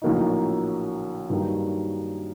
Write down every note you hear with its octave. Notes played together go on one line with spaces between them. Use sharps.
A#1 A2 F#3 A#3 D#4
G2 D#3 F#3 A#3